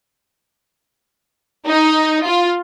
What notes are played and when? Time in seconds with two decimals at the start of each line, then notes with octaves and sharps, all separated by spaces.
1.67 D#4
2.26 F4